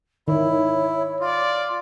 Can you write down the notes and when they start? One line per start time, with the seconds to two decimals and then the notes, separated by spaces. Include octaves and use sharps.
0.28 D#3 E4 C#5
1.21 F4 D5